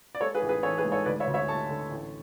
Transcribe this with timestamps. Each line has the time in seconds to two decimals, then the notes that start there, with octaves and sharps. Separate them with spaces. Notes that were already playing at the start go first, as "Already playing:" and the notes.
0.15 D5
0.21 G#3 A4 C#5
0.35 G#4 B4
0.42 A1
0.49 G#4 B4
0.63 E3 A4 C#5
0.78 G#4 B4
0.85 G#2
0.92 A4 C#5
1.06 D2 B4 D5
1.20 C#5 E5
1.27 D2
1.34 C#5 E5
1.48 A3 A5 C#6
1.70 D3
1.91 A1